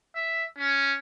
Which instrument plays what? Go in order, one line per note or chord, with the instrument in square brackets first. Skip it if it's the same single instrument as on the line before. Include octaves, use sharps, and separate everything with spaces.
[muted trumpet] E5
C#4